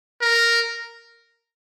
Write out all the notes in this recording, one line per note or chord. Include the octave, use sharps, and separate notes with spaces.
A#4